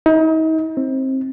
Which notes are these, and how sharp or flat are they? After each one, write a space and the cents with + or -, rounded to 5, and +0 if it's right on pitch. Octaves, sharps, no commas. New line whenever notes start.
D#4 +40
C4 +20